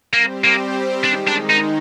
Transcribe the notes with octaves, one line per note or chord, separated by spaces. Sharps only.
G3 A#3 C4 G4 C5
A#3
D#3 G#3 D4 D#4
D4
D#4